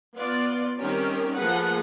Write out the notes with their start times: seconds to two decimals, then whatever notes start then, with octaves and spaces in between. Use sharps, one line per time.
0.15 B3 F4 D5
0.78 D#3 G3 C4 C#4 G4 A#4
1.35 F3 A3 A#3 G#4 B4 F#5